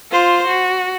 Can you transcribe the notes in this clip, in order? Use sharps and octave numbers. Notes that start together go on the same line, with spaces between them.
F4 C5
F#4